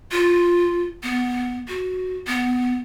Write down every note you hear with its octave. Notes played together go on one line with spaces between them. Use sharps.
F4
B3
F#4
B3